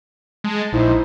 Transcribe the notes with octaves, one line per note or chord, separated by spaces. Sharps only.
G#3 A5
A#1 D#4 E4 C5